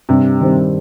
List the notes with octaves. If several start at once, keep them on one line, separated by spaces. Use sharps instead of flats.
G2 C3
D#3 G3 C4